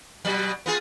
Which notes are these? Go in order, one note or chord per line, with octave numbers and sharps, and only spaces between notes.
B2 F#3
B3 F4 G#4